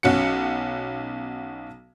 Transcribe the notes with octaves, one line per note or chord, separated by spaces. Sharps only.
B1 C#4 F#4 C#7